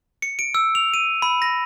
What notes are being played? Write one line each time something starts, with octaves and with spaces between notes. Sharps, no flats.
C#7
D7
E6
F7
D#7
B5
A#6